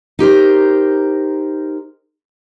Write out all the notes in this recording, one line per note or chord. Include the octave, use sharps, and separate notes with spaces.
D#4 G4 A#4 C5